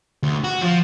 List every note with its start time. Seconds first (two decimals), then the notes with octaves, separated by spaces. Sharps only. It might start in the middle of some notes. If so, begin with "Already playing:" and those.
0.23 D2
0.44 F#4
0.61 F3